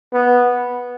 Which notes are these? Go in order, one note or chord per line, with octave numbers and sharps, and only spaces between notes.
B3